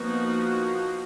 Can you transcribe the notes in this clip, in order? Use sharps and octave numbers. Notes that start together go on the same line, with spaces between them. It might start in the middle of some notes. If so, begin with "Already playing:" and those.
Already playing: F3 A#3 B3 D#4 F#4